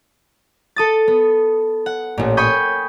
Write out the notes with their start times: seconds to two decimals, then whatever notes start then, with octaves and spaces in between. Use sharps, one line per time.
0.76 A4 D#6 A6
1.08 B3
1.86 F#5
2.18 A1 A#2
2.37 G5 G#5 B5 C#6 D#6 G6